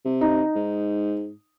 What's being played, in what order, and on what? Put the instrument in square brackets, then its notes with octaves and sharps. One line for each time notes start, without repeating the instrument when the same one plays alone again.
[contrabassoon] C3
[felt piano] D#4
[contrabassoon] G#2